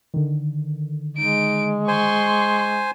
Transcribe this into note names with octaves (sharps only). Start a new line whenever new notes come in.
D3 D#3
G#3 D#4 D7
C5 G#5 C6 C#6